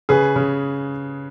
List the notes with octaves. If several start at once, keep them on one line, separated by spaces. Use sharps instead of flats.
C#3 G#4 B4
C#3